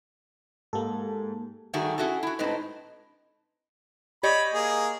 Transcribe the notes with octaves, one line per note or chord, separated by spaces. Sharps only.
G#2 A#3 G4 A4
G2 D#3 G3 A3 F#4 G#4
C#4 E4 F#4 G#4 A4
E4 F#4
A2 G#3 C4 D#4 B4
G4 C#5 D#5 B5
A#3 G#4